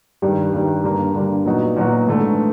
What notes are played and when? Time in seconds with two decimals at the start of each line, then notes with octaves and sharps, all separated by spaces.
0.22 G2 D#3 G3
0.53 G2 D#3 G3
0.84 G2 D3 G3 A#3
1.15 G2 D3 G3 A#3
1.46 A#2 F#3 B3 D#4 F#4
1.76 A#2 F#3 B3 D#4 F#4
2.07 G#2 E3 A3 D4